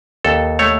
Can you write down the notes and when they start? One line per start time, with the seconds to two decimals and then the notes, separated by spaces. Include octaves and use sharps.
0.25 D#2 A4
0.59 A3 C#5